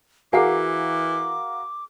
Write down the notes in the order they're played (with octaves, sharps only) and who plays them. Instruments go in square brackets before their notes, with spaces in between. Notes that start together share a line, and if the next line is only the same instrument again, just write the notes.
[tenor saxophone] E3 [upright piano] F#4 A#4 F5 [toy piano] G#4 F#5 G#5 [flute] D6